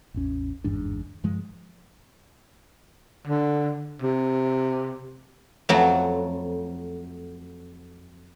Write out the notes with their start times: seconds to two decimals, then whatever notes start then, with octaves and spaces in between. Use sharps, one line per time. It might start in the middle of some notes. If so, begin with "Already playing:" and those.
0.14 A1 E2 C#4
0.64 G1 E2 G#2 D4
1.24 G2 F3 G#3
3.27 D3
4.02 C3
5.69 F2 F#3 A3